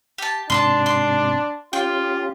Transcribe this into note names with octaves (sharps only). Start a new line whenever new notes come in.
G4 A5
G#2 C3 D4 A5 B5 C6
C6
C#4 F4 G4 G5